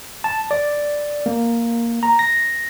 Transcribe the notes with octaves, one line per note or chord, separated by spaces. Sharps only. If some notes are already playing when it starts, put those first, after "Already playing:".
A5
D5
A#3
A#5
A#6